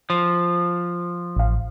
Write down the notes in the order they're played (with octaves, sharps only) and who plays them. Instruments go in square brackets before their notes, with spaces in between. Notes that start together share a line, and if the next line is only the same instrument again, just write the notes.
[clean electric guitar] F3
[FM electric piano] A1 F5